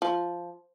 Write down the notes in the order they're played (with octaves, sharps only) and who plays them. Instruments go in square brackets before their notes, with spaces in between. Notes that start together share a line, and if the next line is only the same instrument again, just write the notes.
[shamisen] F3